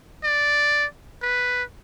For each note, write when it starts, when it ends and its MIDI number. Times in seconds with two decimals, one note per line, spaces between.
0.23 0.85 74
1.22 1.63 71